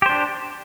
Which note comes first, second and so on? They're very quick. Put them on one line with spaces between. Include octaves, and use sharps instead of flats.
G4 C5 D4